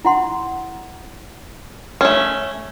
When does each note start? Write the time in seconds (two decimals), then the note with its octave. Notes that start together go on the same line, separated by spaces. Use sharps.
0.05 E4 F#5 C6
2.01 A3 C#4